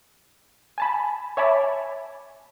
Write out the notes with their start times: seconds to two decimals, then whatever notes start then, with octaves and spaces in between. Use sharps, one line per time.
0.78 G#5 A5 B5
1.37 C#5 E5 G#5 A5 B5 D6